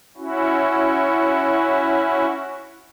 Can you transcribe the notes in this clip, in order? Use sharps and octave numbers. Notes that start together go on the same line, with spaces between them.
C#4 E4 F#4